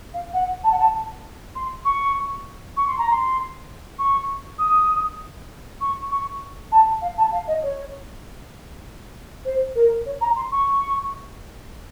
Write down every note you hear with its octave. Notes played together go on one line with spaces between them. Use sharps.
F5
F#5
A5
F#5
A5
C6
C#6
C#6
C6
A#5
C6
C#6
D#6
C#6
C#6
A5
F5
A5
F5
D#5
C#5
C5
A#4
C#5
A#5
C6
C#6